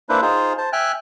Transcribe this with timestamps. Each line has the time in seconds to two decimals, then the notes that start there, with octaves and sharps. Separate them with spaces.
0.09 A#3 D4 E4 B4 C5
0.22 D#4 F4 G#4 C5
0.58 C5 A5
0.73 E5 G5 G#5 F6 F#6